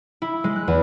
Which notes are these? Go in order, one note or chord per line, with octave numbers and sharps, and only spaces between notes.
E4
G#3
F#6
E2